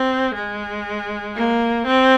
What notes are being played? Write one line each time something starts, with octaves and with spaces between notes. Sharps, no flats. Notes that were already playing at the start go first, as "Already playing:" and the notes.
Already playing: C4
G#3
A#3
C4